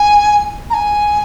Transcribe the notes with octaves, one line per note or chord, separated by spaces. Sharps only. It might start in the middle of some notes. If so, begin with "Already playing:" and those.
Already playing: G#5
A#5
G#5